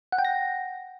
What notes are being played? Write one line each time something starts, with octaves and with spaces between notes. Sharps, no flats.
F#5
G5
A#6